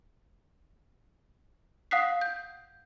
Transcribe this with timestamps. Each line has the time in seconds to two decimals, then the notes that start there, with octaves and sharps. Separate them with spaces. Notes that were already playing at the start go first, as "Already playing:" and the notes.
1.91 F5 F#5 D#6 F#6 B6 C7
2.21 G6